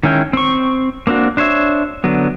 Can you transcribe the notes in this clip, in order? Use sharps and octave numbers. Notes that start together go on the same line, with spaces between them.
D#3 G#3 C#4 E4 G5
C4 C#6
A#3 C4 D4 F#4
D4 C5 C#5 E5
D3 F#3 B3